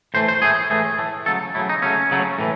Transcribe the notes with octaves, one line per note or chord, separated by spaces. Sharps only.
A2 E3 A3 C5
C5
A2 E3 A3 G#4
A2 E3 A3 G#4
A2 E3 A3
C#3 F#3 A3 A4
C#3 F#3 A3 E4
D#4
C#3 F#3 A3 C#4
C#3 F#3 A3
A2 E3